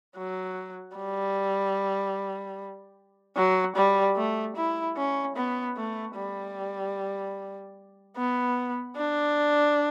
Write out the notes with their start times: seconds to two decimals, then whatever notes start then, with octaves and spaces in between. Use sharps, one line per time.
0.17 F#3
0.96 G3
3.36 F#3
3.76 G3
4.16 A3
4.56 E4
4.97 C#4
5.36 B3
5.76 A3
6.16 G3
8.16 B3
8.96 D4